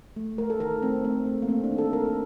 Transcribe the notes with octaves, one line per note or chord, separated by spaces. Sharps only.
A3
A3 A#4
A4
D#3 A#4
A3 C4
A3 C4
A3
A#3
A3 C4
D4
D#3
A4
A#3 A#4
A4